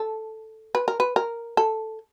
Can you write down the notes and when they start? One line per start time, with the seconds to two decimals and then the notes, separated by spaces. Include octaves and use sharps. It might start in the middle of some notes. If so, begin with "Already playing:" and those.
Already playing: A4
0.75 B4
0.88 A#4
1.00 B4
1.16 A#4
1.57 A4